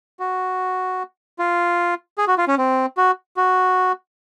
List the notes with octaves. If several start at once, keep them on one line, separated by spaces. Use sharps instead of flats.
F#4
F4
G#4
F#4
F4
C#4
C4
F#4
F#4